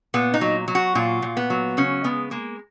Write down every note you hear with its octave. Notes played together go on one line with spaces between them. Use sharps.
A#2 B3
D#4
F#3
F#3
F#4
A#2 F4
A#2
B3
F#3
C#3 C#4
G#3 B3
G#3 A#3